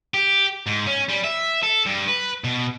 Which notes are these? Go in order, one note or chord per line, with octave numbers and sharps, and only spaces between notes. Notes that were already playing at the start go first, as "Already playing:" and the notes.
G4
G#2
C#4
G3
E5
A4
G2
B4
B2